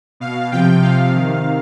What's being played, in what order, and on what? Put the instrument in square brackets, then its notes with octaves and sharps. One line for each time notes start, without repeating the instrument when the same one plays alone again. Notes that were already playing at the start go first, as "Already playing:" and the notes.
[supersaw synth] B2 F5
C3 F3 G5
C3 F3 F5
C3 D#3 F5